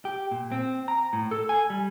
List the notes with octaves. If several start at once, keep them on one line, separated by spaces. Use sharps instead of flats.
G4
A#2
C4
A#5
A2
A4
G#5
G3